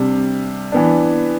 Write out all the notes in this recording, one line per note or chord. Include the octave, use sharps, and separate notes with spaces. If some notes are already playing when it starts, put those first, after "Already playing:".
Already playing: C3 G3 D4
E3 B3 D4